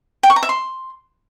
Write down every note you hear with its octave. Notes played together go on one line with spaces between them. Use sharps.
G5
C#6
A#5
E5
C6